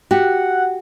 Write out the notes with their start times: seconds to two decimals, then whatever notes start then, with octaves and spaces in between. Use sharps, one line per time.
0.11 F#4 G4 F#5